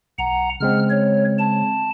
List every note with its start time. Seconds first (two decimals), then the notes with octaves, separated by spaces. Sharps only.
0.19 B1 F#5 A#5
0.61 C#3 G#3 C4 F6
0.90 C#5
1.39 A5